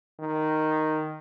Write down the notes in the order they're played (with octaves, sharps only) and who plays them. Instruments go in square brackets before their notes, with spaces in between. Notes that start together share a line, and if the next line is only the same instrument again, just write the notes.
[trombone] D#3